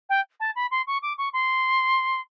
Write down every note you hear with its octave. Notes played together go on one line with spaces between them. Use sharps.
G5
A5
B5
C6
C#6
D6
C#6
C6